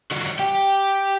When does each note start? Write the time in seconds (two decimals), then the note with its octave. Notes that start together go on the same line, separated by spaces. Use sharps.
0.11 G3 F#4
0.39 G4 G5